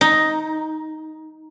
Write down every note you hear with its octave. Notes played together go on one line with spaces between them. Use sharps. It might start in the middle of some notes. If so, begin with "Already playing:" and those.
D#4